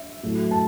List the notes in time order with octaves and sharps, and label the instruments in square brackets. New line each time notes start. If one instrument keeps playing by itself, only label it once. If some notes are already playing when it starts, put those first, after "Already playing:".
Already playing: [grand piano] E5
A2 F#3 A3
A5